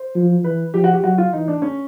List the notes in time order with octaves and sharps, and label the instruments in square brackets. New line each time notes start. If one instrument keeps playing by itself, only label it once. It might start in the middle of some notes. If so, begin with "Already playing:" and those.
Already playing: [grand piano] C5
[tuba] F3
[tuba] E3 [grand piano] B4
[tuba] F3 [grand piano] G4
[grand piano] F#4
G4
[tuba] F#3 [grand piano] F#4
[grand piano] F4
[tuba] E3 [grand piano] D#4
[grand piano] D4
C#4